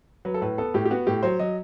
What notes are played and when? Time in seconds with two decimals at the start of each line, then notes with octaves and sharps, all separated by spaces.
0.25 F#3 B4
0.34 A4
0.42 A2 B4
0.58 B3 A4
0.74 A2 G4
0.85 G4
0.91 B3 F#4
1.07 A2 G4
1.23 F#3 C5
1.39 F#3 D#5